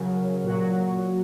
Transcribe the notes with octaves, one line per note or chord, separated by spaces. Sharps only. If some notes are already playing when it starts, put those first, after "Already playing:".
Already playing: C#3 F#3 A#4
A#2 F#3 F#4